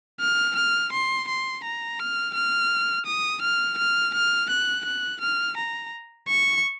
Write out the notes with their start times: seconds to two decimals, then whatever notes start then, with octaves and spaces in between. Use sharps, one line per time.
0.20 F6
0.56 F6
0.92 C6
1.28 C6
1.64 A#5
1.99 F6
2.34 F6
3.06 D#6
3.42 F6
3.78 F6
4.14 F6
4.50 F#6
4.85 F#6
5.21 F6
5.57 A#5
6.28 C#6